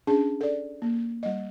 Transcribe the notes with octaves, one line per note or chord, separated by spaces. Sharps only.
C#4 D4 G#4 A5
A4 D5
A#3
G3 D#5